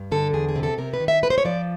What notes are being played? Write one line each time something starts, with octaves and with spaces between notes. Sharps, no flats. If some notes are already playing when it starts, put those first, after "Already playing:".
Already playing: G2
D3 A4
E2 G#4
G#4
C3
A4
C3 A#4
B4
D#3
E5
G#2 B4
C5
C#5
F3 D5